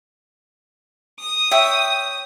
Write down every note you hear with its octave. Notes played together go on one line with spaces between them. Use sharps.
D#6
C#5 E5 G5